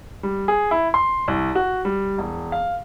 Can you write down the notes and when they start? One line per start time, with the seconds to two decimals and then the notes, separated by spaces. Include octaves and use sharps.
0.23 G3
0.48 G#4
0.71 E4
0.94 C6
1.28 C2
1.55 F#4
1.85 G3
2.18 E1
2.52 F5